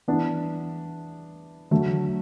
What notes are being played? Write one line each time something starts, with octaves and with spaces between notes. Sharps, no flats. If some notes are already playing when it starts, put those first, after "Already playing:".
E3 B3 D4
D3 F#3 A3